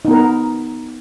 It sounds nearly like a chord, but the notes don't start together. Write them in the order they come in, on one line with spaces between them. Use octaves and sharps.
D#4 B3 A#4